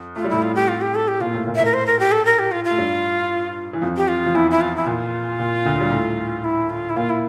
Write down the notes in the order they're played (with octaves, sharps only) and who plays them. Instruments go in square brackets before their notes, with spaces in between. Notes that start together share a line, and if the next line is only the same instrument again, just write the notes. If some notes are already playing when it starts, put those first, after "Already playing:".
Already playing: [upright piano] F2
[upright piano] A3 [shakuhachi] F4
[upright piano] G3
[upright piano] A2 A3 [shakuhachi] E4
[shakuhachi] F4
G4
F4
G4
A4
G4
[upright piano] A#2 A#3 [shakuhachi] F4
[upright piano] A2 A3
A#2 A#3
[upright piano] A2 A3 [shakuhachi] E5
[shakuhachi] A#4
C5
A#4
G4
A4
A#4
G4
F4
F4
[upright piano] A3
G2 G3
E3
F2 F3
[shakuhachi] G4
F4
[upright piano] F3
[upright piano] E2 E3 [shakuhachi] E4
[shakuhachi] E4
F4
E4
[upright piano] A#2 [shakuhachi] F4
[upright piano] A#2
D2 D3
G3
A2 A3
[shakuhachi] E4
F4
E4
[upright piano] A#2 A#3 [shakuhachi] F4
[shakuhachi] E4